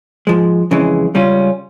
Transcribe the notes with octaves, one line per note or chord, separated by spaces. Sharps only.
G#2 F3 G#3
F2 C#3 E3 G#3
C#2 C#3 G3 C#4 F4